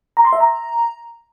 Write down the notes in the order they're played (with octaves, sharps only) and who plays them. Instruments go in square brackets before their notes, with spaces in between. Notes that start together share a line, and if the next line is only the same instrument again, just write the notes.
[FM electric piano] A#5
C6
E5
A#5